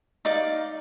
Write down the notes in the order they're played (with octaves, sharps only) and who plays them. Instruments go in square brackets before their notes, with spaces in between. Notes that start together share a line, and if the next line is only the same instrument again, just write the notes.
[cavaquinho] D#4 D5 F5